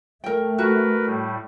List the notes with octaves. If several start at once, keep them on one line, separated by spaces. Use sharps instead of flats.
A3 A#4 G5
F#4 A#4 B4
A2 G3